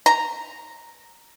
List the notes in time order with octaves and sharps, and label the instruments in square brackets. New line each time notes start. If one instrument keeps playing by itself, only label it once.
[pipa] A#5